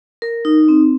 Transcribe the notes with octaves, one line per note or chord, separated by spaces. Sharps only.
A#4
D#4
C4